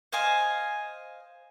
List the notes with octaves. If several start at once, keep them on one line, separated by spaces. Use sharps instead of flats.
C5 D#5 F5 G#5